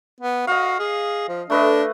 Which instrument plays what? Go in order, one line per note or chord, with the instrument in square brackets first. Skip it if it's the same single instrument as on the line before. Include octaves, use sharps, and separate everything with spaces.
[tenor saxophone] B3
[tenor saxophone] F#4 [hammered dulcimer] D#5 F5
[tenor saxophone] G#4
F3
[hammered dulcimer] A3 B4 D#5 [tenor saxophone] D4